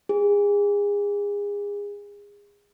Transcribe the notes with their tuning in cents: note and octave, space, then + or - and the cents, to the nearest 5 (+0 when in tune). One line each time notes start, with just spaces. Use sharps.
G#4 -30